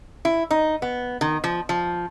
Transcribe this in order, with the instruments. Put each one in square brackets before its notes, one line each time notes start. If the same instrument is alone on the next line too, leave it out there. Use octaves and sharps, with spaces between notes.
[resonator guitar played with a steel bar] E4
D#4
B3
D#3
F3
F3